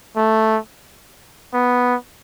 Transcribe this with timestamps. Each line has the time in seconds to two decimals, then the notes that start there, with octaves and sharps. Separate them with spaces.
0.17 A3
1.54 B3